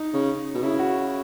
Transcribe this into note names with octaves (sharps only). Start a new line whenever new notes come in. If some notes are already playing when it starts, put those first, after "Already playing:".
Already playing: D#4
C#3
B2
C#3 E4
F#4